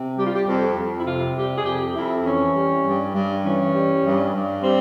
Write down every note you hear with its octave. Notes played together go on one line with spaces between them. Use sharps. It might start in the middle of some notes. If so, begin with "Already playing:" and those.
Already playing: C3
G3 G4
F4
G4
F2
F2
E4
C3 F4
G3 G4
G#4
F2 G4
F2 E4
E3 C#4
G3
G2
G2
E3 C#4
G3
G2
G2
G3 C4